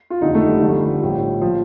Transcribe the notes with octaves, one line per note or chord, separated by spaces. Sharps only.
F4
F1 D#2 D3 D#4
A3
G3
G1 G2 D3 F3
A#1 A2 F3
A#2 F3